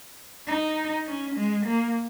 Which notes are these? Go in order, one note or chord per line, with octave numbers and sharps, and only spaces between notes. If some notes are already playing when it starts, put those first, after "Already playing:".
D#4
C#4
G#3
A#3